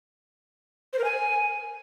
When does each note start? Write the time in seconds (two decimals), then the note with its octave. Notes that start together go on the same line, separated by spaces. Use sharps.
0.93 C5
0.99 A#4
1.04 G#5